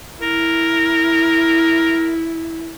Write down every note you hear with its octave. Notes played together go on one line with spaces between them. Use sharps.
E4 A#4